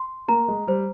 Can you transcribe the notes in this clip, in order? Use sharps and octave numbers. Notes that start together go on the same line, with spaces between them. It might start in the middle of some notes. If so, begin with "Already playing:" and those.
Already playing: C6
A#3 A#5
G#3
G3 C5